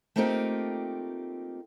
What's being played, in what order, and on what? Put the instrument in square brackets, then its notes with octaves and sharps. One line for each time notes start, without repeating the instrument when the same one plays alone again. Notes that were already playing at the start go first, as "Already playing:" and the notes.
[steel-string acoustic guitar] A3 A#3 C4 D#4 F4 G4